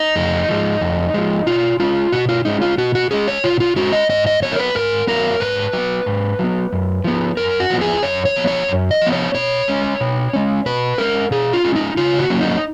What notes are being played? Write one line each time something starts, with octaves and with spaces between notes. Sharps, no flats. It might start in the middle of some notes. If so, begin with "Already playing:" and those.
Already playing: D#4
F2
F3 G#3
F2
F3 G#3
B2 F4
G#3 C#4 F4
B2 F#4
F4
G#3 C#4 D#4
F4
B2 F#4
F#4
G#3 C#4 G#4
C#5
B2 F4
F4
G#3 C#4 F#4
D#5
G#2 D#5
D#5
F#3 B3 C#5
A#4
B4
G#2 A#4
F#3 B3 A#4
G#2 B4
F#3 B3
G#2
F#3 B3
F#2
F3 B3
F#2 A#4
F#4
F3 B3
G#4
F#2 C#5
C#5
F3 B3
C#5
F#2
D#5
F3 B3
C#5
B2 C#5
G#3 C#4
B2
G#3 C#4
B2 B4
G#3 C#4 A#4
B2 G#4
F4
G#3 C#4
D#4
C#3 F4
F#4
F#3 A#3 C#4
D#4